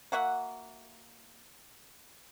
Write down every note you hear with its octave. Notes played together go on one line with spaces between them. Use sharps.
A#3 F#4 E5 F#5